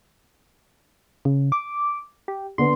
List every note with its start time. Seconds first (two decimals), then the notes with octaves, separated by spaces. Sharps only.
1.25 C#3
1.52 D6
2.28 G4
2.58 D3 B3 C6